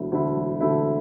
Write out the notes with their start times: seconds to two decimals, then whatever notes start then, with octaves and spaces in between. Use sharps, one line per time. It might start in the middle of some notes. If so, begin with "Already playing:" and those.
Already playing: E1 D2 D3 A3 E4
0.12 D2 D3 A3 E4
0.36 E1
0.60 D2 D3 A3 E4